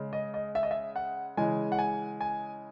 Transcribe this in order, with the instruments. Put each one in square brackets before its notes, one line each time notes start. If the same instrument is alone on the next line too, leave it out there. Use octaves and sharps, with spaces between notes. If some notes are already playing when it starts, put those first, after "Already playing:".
Already playing: [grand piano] C#3 G#3
D#5
D#5
E5
D#5
E5
F#5
C#3 E3 G#3 G#5
F#5
G#5
G#5